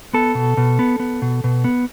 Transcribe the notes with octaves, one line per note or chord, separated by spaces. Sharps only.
B3 A4
B2
B2
B3
B3
B2
B2
B3